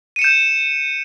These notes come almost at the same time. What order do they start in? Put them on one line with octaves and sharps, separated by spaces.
D#7 C#7 E7 G6